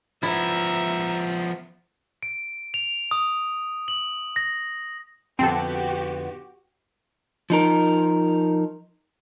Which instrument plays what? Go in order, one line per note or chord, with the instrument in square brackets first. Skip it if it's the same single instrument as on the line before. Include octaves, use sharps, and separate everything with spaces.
[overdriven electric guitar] F3 B3 [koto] E4 [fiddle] E5 A#5
[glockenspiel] D7
F7
D#6
F#7
A#6
[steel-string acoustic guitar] F2 D3 B3 [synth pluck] C4 A4 [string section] F#4 G4
[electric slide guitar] F3 D#4 A#4